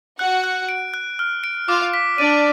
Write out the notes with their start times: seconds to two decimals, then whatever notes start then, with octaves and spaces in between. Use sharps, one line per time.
0.18 F#4 F#5 F#6
0.44 F#6
0.69 D7
0.94 F#6
1.19 F6
1.44 D7
1.68 F4 F5 D6
1.94 B6
2.18 D4 D5 D#7